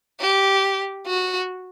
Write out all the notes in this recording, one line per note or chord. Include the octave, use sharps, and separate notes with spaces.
G4
F#4